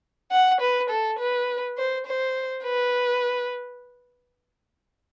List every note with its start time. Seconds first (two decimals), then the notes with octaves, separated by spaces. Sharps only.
0.31 F#5
0.61 B4
0.90 A4
1.19 B4
1.77 C5
2.06 C5
2.64 B4